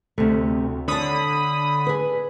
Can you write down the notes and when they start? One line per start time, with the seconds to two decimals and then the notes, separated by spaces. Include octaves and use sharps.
0.18 D2 C3 A3
0.88 D3 C#5 A5 B5 D#6
1.87 G#4 B4